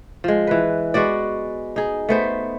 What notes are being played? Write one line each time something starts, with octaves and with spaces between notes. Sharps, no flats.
F3 G#3
E3 B4
G#3 B3 F#4 D5
D#4 G#4
A3 B3 C5